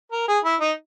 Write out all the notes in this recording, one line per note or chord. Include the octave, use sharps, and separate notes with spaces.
A#4
G#4
E4
D#4